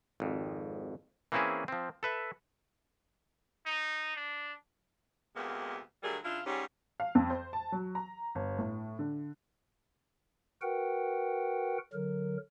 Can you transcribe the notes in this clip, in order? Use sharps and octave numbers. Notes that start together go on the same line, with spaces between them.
G#1 F2
E3 A#3 C4 C#4 E4 G#4
F3 C4
A4 B4 E5
D#4
D4
D2 C3 G#3 A#3 B3
D3 F#3 G3 A3 G#4 A#4
C#3 D4 E4 F4
G#2 G3 C#4
F5
F2
C5
A5
F#3
A#5
G1
A2
D3
F#4 A#4 B4 F#5 G5
D3 F#3 A#4